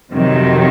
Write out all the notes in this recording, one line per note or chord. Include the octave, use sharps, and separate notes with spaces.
F2 C3 D#3 F#3